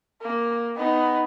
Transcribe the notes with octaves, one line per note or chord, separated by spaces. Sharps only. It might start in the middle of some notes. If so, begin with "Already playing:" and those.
A#3
B3 D#4